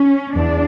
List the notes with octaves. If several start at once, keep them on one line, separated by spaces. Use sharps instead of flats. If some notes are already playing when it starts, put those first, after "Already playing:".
Already playing: C#4
E2 D4